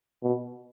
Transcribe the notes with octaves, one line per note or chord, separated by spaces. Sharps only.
B2